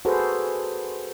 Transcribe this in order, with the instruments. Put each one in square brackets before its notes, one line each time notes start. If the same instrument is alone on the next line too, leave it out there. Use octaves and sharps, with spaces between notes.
[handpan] F#4 G#4 A4 B4 C5